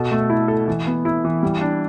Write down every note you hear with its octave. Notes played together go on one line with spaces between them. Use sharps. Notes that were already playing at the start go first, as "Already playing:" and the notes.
Already playing: B2 A4
A3
E4
A4
E3
B3
E4
E3
G3
D4